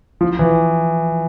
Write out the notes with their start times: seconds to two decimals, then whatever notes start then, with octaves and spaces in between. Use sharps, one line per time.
0.21 F3
0.39 E3